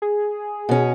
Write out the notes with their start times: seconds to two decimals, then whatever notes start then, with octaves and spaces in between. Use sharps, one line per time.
0.02 G#4
0.69 B2 C#4